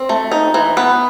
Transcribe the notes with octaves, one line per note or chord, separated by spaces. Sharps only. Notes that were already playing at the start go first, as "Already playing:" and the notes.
Already playing: C4
A3
D#4
E3
B3 B4